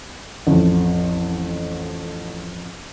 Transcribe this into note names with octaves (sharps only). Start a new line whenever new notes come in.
A1 F2